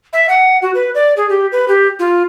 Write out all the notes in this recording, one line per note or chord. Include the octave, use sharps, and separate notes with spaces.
E5
F#5
F#4
B4
D5
G#4
G4
B4
G4
F4